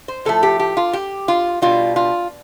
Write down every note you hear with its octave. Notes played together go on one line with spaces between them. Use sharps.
C5
A2 F3 A3 A4
G4
G4
F4
G4
F4
B2 G3 F4
F4